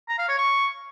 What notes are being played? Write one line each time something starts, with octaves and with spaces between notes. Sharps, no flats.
A#5
F5
C#5
C#6